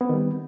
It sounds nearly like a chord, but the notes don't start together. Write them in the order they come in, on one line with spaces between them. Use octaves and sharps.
B3 C4 D#3 G3